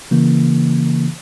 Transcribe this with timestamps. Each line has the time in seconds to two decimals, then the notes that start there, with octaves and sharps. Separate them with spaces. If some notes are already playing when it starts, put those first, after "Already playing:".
0.11 C#3 E3 A#3